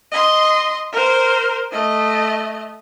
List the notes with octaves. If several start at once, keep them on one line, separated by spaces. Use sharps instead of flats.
D#5 C6
A#4 C5
A3 D#5